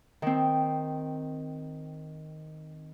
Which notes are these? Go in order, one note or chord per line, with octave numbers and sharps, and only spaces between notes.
D#3 C4